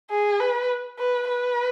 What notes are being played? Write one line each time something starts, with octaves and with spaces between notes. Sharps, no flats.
G#4
B4
B4
B4